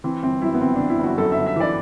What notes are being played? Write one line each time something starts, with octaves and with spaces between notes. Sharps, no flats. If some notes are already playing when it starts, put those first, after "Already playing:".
E3 C4
G1 C4
F#2 E4
B3
G1 C4
E3 D4
E4
G1 F#4
F#2 A4
E5
G1
E5
E3 D5